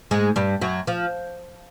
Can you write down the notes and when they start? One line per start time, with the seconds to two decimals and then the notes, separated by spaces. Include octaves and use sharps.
0.11 G#2 G#3
0.36 G2 G3
0.61 F#2 F#3
0.87 F3